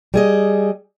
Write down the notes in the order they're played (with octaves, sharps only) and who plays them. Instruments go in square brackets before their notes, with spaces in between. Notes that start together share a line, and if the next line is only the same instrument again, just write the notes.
[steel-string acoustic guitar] G3 G#4 D#5